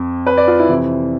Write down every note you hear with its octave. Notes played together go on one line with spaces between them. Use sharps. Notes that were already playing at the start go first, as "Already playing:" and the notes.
Already playing: F2
B4
D5
F4
E4
F2 C3 E3